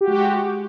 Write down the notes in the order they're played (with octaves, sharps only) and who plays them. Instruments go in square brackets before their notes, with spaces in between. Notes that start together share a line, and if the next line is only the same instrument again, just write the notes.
[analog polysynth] G4
F#4
G#3